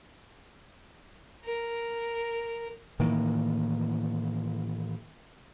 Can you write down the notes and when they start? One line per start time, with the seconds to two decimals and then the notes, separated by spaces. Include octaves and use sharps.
1.45 A#4
2.99 A2 D#3 E3 A#3